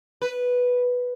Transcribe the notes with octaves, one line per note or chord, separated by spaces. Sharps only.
B4